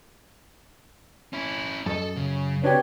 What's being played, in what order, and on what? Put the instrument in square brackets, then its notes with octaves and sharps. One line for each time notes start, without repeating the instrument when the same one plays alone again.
[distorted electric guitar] C#4 E4
[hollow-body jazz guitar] F#2 D#5 [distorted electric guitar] A4 A5
[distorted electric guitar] C#3
[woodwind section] C4 B4 C#5 [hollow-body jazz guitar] D4 F#4 G4